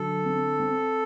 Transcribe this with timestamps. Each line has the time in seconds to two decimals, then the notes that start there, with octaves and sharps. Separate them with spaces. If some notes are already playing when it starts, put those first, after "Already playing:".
Already playing: D3 F#3 A4
0.25 C4
0.60 C4